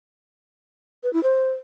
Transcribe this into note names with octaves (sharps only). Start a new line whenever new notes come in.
B4
E4
C5